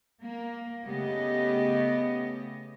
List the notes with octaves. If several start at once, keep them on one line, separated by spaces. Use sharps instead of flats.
A#3
C#3 A3 B3 G4 D#5